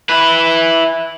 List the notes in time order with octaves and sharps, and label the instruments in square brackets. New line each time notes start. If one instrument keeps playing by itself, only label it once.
[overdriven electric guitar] E4 B4